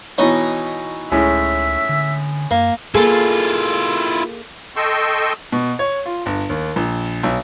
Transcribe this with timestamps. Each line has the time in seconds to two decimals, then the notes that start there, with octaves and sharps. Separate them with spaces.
0.18 B2 E3 B3 D#4 C#5 D#5
1.12 C#2 A2 G#3 C#4 E5
1.89 D3
2.51 F#2 A#3
2.95 A#3 E4 F4 G#4 A4
4.76 A4 D#5 G5 C6 C#6 E6
5.52 B2
5.79 C#5
6.06 F4
6.26 G1
6.50 D#2
6.76 A#1
7.23 B1